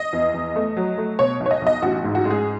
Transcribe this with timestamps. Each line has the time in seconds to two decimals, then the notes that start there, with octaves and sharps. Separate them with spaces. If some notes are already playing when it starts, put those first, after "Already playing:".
Already playing: D#5
0.13 E2
0.34 E2
0.56 A3
0.77 F#3
0.98 A3
1.19 B2 C#5
1.40 B1
1.46 C#5
1.51 D#5
1.62 B1 D#5
1.82 A1 F#4
2.04 G#2
2.15 F#4
2.25 G#3
2.31 G#4